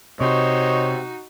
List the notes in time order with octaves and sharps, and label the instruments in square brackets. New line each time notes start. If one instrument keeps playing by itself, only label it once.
[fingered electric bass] C3 [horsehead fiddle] D#4 F#4 [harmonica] C5 C#5 [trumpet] D#5